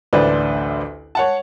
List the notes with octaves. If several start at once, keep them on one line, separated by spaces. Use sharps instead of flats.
A1 D2 D4 B4 C5
C#5 F#5 A5